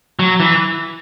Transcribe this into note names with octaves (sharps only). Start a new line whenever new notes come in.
F#3
E3